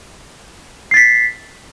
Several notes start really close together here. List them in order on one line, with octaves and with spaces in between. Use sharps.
C7 A6 B6